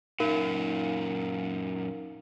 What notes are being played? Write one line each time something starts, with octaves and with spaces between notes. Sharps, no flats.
F#2 A#2 D#4 A#4 F5